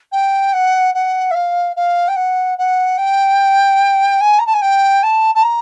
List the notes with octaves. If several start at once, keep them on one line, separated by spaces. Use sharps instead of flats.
G5
F#5
F#5
E5
F5
F5
G5
F#5
F#5
G5
G#5
A#5
A5
G#5
G5
A5
A5
A#5